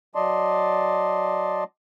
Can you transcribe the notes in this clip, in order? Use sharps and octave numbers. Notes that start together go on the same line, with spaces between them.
F#3 D5 D#5 A5 C6